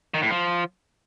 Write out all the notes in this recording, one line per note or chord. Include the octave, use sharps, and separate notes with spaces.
D#3
A2
F3